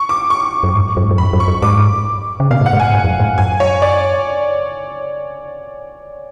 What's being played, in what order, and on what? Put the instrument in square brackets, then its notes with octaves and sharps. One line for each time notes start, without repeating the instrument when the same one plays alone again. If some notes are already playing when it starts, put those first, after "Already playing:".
Already playing: [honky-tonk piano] C#6
D6
C#6
[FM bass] F#2
G#2
F#2
G#2
F#2
[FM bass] F2 [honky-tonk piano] B5
[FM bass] F#2
[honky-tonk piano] C#6
[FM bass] F#2
[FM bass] G#2 [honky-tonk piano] D6
[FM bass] C#3
[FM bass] B2 [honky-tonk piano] F5
[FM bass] A2
[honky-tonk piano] F#5
[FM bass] G#2
[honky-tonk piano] G#5
[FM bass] G#2
F2
F#2
A2
G#2
[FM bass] F#2 [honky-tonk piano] G#5
[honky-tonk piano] C#5
D5